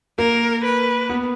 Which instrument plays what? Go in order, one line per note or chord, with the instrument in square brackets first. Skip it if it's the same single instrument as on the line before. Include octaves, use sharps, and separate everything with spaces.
[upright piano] A#3 [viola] A#4
[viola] B4
[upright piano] B3